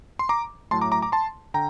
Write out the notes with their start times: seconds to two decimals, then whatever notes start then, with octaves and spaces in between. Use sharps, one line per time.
0.19 C6
0.29 A#5 D6
0.71 A2 F#3 A3 A5 C6
0.81 A#5 D6
0.92 A#5 D6
1.02 A#5 D6
1.12 A5 C6
1.54 D3 G5 A#5